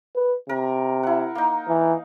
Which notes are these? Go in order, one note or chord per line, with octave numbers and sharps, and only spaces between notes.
B4
C3 A#4
E4 F#5
A#3 D#4
E3